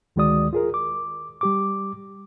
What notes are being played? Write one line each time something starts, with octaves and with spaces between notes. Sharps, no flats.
D2 D#3 G#3 F#4 D5 D#6
F4 G#4 A#4
D6
G3 G4 D6